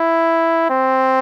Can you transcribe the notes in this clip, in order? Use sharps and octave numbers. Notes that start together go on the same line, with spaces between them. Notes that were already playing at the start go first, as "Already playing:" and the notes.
Already playing: E4
C4